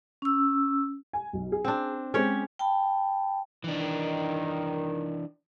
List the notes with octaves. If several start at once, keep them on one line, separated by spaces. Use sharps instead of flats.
C#4 E6
G#5
B1
G#4
C4 D4
G#3 C4 C#4 G4 C#5
G5 A5 B5
D#3 E3 D4